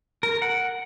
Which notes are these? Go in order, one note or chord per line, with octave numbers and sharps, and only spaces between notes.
A#4
F#5